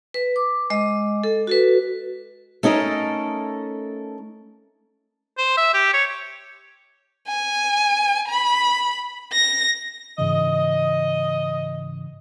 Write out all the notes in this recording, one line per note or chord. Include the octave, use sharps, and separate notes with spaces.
B4
D6
G#3 D#5 D6
A4
F#4 A4 B4
A3 C#4 D#4 A4 A#4
C5
E5
G4
C#5
G#5
B5
A#6
G#2 C#3 E3 D#5